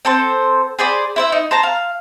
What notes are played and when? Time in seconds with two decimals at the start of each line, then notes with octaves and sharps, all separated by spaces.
0.05 C4 A4 C5
0.79 G#4 C5 D5 B5
1.16 E4 C5 E5
1.32 D#4
1.51 C5 A5 A#5
1.63 F5